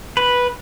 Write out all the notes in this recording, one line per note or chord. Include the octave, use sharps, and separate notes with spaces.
B4